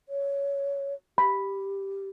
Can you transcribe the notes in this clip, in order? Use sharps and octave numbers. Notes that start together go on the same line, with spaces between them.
C#5
G4 B5